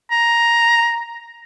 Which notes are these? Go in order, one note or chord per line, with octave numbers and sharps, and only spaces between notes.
A#5